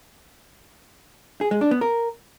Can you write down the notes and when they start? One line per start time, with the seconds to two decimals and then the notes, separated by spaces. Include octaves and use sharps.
1.41 G#4
1.51 G#3
1.61 D4
1.71 B3
1.81 A#4